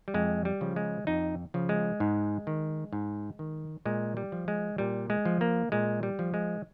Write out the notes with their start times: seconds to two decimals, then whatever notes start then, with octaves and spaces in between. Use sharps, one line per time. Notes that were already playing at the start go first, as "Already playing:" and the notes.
0.08 G3
0.14 F2 G#3
0.45 G3
0.61 C#3 F3
0.76 G#3
1.07 F2 D#4
1.54 C#3 F3
1.69 G#3
2.00 G#2
2.47 D#3
2.93 G#2
3.39 D#3
3.85 A#2 G#3
4.17 G3
4.32 F3
4.48 G#3
4.78 A#2 G3
5.10 G#3
5.25 F3
5.41 A#3
5.72 A#2 G#3
6.03 G3
6.19 F3
6.34 G#3